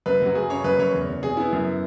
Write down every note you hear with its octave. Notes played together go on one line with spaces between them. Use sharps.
F#2 B4
F#3 F#4
F#2 G#4
C#3 C#5
F#2 B4
F#2 C#5
E2
E2
B2 G#4
B3 E4
F#2